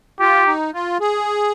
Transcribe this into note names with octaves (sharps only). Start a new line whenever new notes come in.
F4 G4
D#4
F4
G#4